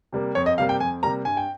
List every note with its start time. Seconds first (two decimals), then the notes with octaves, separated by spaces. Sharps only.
0.12 C3 G3 A#3
0.35 F2 C#5
0.46 D#5
0.58 C3 G3 A#3 F5
0.69 G5
0.80 F2 G#5
1.03 C3 G3 A#3 A#5
1.25 G2 G#5
1.37 G5